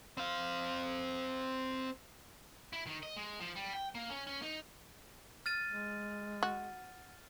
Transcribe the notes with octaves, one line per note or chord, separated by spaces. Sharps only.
C4 F5
E4
D#3
D#5
G#3
F3
G3
G5
A#3
C#4
C#4
D#4
F6 A6 D#7
G#3
F#4